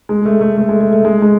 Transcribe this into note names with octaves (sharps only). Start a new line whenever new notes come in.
G#3
A3
A3
A3
G#3
A3
A3
G#3
G#3